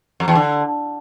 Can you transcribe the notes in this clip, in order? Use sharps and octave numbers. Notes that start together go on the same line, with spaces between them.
F2
E2
D3